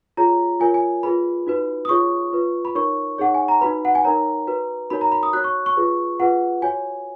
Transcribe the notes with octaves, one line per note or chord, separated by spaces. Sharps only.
F4 G#4 C#5 A#5
F4 A#4 C#5 G#5
G#5
F4 G#4 B4 B5
D#4 F#4 B4
D#6
F4 G#4 C#5 C#6
F4 B4
B5
D#4 A#4 C#5 C#6
D#4 G#4 C#5 F#5
G#5
A#5
D#4 F#4 B4 B5
F#5
G#5
D#4 A#4 C#5 A#5
F#4 B4
D#4 F#4 A#4 C#5 B5
A#5
B5
D#6
F#4 C#5 F#6
C#6
C#6
F4 G#4 B4
F4 G#4 B4 F#5
F#4 C#5 G#5